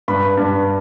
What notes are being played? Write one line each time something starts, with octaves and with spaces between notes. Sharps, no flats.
G2 B5
G2